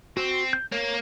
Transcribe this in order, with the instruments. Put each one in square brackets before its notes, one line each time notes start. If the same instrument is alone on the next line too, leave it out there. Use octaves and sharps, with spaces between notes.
[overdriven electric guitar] C4 [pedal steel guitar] F#4
[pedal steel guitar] G6
[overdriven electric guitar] A#3 [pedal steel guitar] C#5